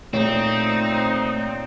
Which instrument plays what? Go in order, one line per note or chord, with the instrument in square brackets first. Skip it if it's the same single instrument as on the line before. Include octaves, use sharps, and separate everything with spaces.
[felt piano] A#2 C#5 [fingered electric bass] A3 [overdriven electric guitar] C4 [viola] D#4